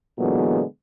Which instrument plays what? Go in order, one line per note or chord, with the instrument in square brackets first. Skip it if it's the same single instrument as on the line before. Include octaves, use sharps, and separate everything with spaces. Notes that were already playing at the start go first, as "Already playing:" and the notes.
[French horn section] A#2 D3 E3 F#3 G#3 B3